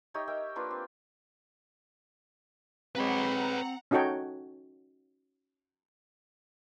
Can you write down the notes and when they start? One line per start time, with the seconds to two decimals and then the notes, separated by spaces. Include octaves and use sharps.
0.14 D#4 G4 C#5 E5
0.28 A#4 E5 G5
0.56 A#3 D4 F4 B4
0.71 C4
2.95 G#3 C4 B4 C#5 F#5 A#5 B5
3.91 C#4 D#4 F#4 A4 C#5 G5